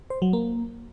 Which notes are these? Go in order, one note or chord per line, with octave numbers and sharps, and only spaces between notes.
C5
F#3
A#3